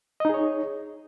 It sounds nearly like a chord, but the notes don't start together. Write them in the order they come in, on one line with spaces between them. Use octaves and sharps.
D#5 D#4 G#4 C#5